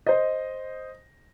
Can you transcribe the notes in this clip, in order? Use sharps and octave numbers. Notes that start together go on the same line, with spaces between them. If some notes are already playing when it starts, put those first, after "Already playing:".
C5 D#5